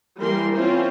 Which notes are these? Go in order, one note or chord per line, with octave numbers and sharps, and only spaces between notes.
E3 G3 A#3 A#4 C6
C4 C#4 E4 F4 C5